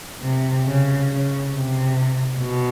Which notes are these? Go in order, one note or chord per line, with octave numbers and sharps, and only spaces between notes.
C3
C#3
C#3
C3
B2